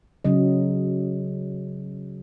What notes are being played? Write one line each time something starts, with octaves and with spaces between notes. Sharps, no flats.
C#3 F#3 D#5